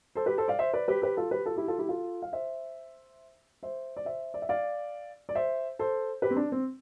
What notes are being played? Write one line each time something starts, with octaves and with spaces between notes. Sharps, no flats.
A4 C5
G4 B4
A4 C5
D5 F5
C5 E5
B4 D5
G4 B4
G4 B4
F4 A4
G4 B4
F4 A4
E4 G4
F4 A4
E4 G4
F4 A4
F5
C5 E5
C5 E5
D5
C5 E5
D5
E5
D5 F5
D5
C5 E5
A4 C5
G4 B4
C4
D4
C4